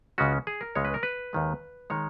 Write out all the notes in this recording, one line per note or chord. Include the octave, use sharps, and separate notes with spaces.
C#2 C#3 G#3 C#4 F#4
G#4
A#4
C#2 C#3 G#3 C#4 C#5
B4
A#4
B4
D#2 D#3 G#3
D#3 G#3 C#5